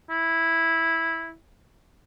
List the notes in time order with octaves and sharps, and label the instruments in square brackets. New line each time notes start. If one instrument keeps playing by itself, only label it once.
[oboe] E4